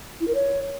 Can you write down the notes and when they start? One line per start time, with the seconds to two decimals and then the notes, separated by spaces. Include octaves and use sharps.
0.20 E4
0.28 A#4
0.35 C#5